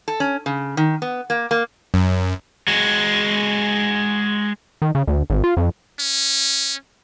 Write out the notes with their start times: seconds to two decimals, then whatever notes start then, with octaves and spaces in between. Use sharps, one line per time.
0.08 A4
0.20 C#4
0.46 C#3
0.77 D#3
1.02 B3
1.30 A#3
1.51 A#3
1.94 F#2
2.68 G#3 F#4
4.82 D#3
4.95 C#3
5.07 D2
5.30 G#1
5.44 F4
5.57 F2
5.99 C#4